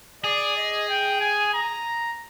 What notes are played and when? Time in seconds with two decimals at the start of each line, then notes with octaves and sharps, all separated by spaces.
0.24 G#4 D5
0.57 D#5
0.89 G5
1.21 G#5
1.54 A#5